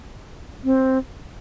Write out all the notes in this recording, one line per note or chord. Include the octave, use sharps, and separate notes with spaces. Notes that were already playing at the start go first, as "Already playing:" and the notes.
C4